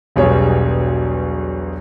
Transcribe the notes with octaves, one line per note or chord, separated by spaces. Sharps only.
E1 B1 G3 G#4 C#5